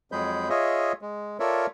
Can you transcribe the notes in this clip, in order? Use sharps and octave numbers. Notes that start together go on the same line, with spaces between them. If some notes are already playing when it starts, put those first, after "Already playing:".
F2 F#3 G#3 G#4 B5 G6
F4 G#4 C#5 D#5 E5
G#3
F4 A4 A#4 C#5 D5 E5